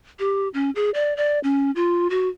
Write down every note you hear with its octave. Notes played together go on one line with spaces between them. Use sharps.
G4
C#4
G#4
D5
D5
C#4
F4
F#4